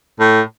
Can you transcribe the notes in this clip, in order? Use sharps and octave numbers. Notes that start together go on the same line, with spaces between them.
A2